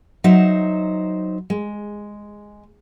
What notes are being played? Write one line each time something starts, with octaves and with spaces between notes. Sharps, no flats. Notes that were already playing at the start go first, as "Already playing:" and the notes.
F#3 D#4 C5 E5
G#3